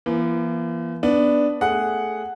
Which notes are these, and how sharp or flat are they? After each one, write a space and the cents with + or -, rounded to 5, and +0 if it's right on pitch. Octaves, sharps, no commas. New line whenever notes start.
E3 +45 A#3 +45
B3 +0 D4 +0
A3 +0 G#4 +0 F#5 +0